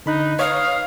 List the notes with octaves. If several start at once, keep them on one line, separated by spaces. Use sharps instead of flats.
D3 D#4 B5 F#6
B4 C#5 F5 D#6